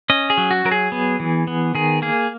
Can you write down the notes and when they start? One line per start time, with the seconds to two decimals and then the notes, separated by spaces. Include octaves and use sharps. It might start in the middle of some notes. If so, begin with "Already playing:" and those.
0.10 C#4 D#5
0.30 G#4
0.38 F#3
0.51 F#4
0.65 F#3 A#4
0.72 G#4
0.92 B3
1.20 E3
1.47 B3
1.75 D#3 G#4
2.02 A#3 G#4